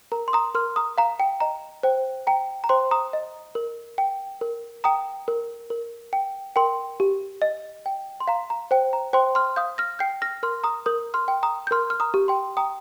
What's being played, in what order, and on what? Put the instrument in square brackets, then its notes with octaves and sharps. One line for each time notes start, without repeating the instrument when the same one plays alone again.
[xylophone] A#4 A#5
C6
A#5 D#6
A#4 C6 F6
A#5 D#6
F5 A#5
G5
D#5 A#5
C5 G5
G5 A#5
A#5
C5 G5 C6
A#5 D#6
D#5
A#4
G5
A#4
G5 A#5 D#6
A#4
A#4
G5
A#4 G5 C6
G4
D#5
G5
C6
F5 A#5
A#5
C5 G5
A#5
C5 G5 C6
C6 F6
F5 D#6 G6
F6 A#6
G5 G6 C7
F6 A#6
A#4 C6 F6
A#5 D#6
A#4 D#6 G6
C6 F6
G5
A#5 D#6
G6
A#4 C6 F6
F6
A#5 D#6
G4
G5 C6
G5 A#5 D#6